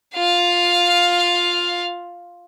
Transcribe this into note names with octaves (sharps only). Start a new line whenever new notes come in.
F4 F5